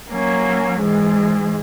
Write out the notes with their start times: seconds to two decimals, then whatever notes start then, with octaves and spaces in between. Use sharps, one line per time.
0.11 F#3 A#3 C#4
0.81 G#2 E3 G#3